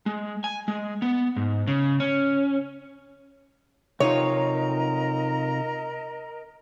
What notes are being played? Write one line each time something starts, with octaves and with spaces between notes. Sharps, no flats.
G#3
G#5
G#3
B3
G#2
C#3
C#4
C3 D#4 F4 A#4 C#5 D#5 A#5